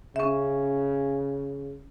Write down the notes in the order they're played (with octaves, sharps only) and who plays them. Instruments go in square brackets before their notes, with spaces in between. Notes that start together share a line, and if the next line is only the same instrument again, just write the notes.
[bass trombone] C#3 [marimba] C#4 E5